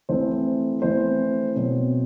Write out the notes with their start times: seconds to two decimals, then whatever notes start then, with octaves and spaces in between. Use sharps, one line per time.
0.09 E3 A3 C4 C5
0.82 E3 A3 C4 C5
1.55 B2 F#3 C4